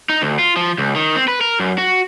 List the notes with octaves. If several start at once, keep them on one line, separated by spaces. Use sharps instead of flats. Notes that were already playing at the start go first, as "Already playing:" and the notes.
D#4
D2
F4
F3
C#2
D#3
C4
B4
A#4
F#2
F#4